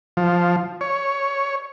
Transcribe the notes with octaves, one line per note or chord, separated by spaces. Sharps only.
F3
C#5